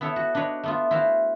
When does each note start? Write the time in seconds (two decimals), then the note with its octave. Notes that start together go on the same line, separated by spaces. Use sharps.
0.01 B3 E4 A4 C#5
0.16 F#4
0.35 D4 D#4 B4 C#5
0.63 A3 B3 F4
0.91 E4 F#4 C5 F5